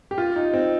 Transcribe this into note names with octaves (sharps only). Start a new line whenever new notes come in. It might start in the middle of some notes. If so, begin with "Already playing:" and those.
G4
F4
D#4
C4